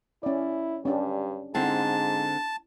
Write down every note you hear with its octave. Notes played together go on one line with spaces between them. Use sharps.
C#4 E4 D5
G2 C#4 D4 G4
G#2 D3 C4 E4 G5 A5